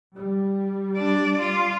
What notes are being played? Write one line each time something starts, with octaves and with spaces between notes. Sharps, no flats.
G3
D4 D5
F4